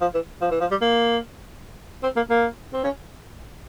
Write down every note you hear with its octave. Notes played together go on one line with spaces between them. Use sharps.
F3
E3
F3
E3
F3
G3
A#3
C4
A#3
A#3
C4
C#4